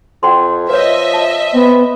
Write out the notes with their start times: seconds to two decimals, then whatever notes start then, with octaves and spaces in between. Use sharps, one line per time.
0.23 F2 F#5 G5 C6
0.70 F3 B4 C#5 D#5 E5
1.13 A5
1.54 B3 C4